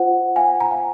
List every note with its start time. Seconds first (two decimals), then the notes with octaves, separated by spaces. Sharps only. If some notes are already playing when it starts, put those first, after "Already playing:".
Already playing: F4 C5 F#5
0.36 F5 G#5
0.60 A#5
0.71 F5 G#5